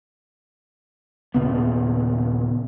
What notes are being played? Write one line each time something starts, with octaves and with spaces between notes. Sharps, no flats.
D#1 A#2 C#3 B3